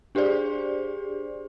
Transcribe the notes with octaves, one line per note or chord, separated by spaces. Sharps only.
D4 G4 G#4 C5 D5